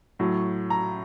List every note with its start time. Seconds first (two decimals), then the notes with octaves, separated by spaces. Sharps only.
0.19 A2 F#3
0.70 A#5